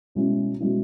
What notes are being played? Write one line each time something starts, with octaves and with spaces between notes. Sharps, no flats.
B2 G#3 C#4 E4
B2 G#3 C#4 E4